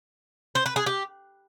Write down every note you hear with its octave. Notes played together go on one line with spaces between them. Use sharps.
C5
B4
G#4
G4